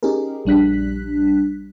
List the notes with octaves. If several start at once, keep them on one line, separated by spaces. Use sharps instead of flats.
C#4 D#4 G4 G#4 A#4
A#1 G3 D4 F#6 B6